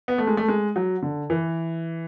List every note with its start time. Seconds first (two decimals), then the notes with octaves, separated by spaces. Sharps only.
0.08 B3
0.18 A3
0.27 G#3
0.37 A3
0.48 G#3
0.76 F#3
1.02 D3
1.30 E3